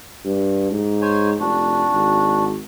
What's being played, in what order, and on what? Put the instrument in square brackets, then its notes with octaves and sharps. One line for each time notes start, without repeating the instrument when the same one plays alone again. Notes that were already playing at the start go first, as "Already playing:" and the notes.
[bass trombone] G2
G#2
[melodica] C5 C#5 G#5
[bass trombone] F1 [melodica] D4 F#4
[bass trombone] G#1